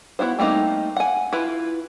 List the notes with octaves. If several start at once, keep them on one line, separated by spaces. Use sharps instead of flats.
B3 E4 F#4 C5
G3 A3 A#3 C4 D#4
F#5 G#5
E4 F4 B4